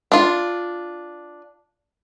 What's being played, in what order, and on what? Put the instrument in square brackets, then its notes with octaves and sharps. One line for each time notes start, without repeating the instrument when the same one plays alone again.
[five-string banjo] D4 F4